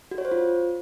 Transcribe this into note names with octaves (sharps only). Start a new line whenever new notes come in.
F#4
C#5
C5
F4